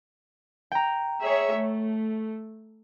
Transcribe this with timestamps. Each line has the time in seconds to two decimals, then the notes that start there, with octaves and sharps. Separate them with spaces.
0.72 G5 A#5
1.21 G#4 C#5 E5
1.53 A3